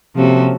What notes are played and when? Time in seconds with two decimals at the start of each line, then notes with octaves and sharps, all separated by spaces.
0.16 C3 F3 A#3 C#4 F#4 A4